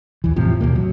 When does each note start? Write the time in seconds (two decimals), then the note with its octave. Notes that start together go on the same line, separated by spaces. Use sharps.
0.24 D#2 E3
0.36 E2 A2 C3 F3
0.61 D#2 B2 A#3
0.76 F#3